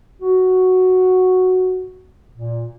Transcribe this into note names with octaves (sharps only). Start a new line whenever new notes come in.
F#4
A#2